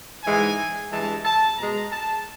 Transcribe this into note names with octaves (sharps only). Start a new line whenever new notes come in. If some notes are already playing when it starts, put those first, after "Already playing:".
G#2 E3 G#3 G#5
G2 E3 G#3 A5
A5
B2 G#3 A#5
A5